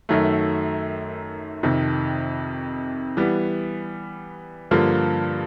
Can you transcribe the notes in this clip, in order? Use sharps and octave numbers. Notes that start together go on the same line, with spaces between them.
F#2 D#3 F#3 A3
F2 C3 D#3
E3 G3 B3
G2 D3 F3 A#3